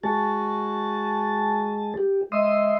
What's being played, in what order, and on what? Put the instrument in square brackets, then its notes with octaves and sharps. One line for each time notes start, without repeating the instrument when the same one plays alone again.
[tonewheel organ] G#3 G#4 A5 [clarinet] F#4
[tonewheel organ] G4
[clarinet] G#3 [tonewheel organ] E5 C6 D#6